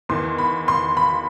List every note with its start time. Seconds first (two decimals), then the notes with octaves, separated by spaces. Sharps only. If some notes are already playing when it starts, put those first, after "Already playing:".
0.09 E2 D#3 C6
0.38 B5
0.68 C6
0.97 B5